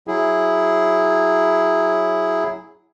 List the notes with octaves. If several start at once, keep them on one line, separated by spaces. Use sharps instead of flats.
F#3 E4 G#4